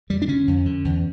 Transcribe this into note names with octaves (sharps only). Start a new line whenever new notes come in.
F2 G3
D4
D3 C#4
F2
D3
E2